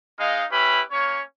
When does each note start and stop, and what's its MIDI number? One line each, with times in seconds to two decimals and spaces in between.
0.19 0.44 56
0.19 0.44 63
0.19 0.44 75
0.19 0.44 77
0.51 0.82 61
0.51 0.82 64
0.51 0.82 67
0.51 0.82 71
0.51 0.82 83
0.90 1.20 58
0.90 1.20 61
0.90 1.20 73